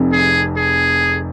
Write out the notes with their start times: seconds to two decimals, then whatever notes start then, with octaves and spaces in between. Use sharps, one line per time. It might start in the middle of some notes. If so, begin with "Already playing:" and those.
Already playing: F1 F2 C3
0.12 G#4
0.57 G#4